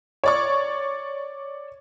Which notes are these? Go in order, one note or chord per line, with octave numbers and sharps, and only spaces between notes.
C#5 D5 C#6